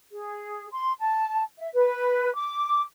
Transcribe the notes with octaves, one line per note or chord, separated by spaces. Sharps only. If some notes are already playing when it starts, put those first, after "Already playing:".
G#4
C6
A5
E5
B4
D6